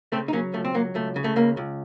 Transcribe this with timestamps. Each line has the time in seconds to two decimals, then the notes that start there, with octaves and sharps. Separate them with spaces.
0.12 C#3 A3 C4
0.28 D#4
0.33 F#3 A#3 C#4
0.54 C#2 A3
0.65 C4
0.74 F#3 A#3
0.95 C#2 A3
1.16 C#3
1.24 A3
1.36 C#2 A#3
1.57 C#2